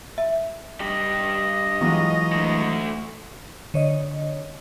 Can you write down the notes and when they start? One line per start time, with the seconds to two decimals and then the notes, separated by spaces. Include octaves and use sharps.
0.18 E5
0.81 G2 G4 D#5
1.81 E3 F#3 G#3 E4 F4 C#6
2.33 D3 A3
3.74 D3 C#5 D#5